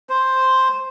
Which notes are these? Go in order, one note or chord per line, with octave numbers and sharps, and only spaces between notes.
C5